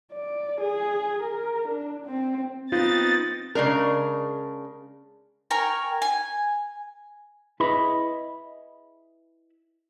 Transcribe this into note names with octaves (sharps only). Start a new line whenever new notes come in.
D5
G#4
A#4
D4
C4
B3 C4 D#4 F4 A6
C#3 G#3 D4 A#4
A#4 G5 G#5 C#6
G#5
E4 G#4 B4 D#5 B5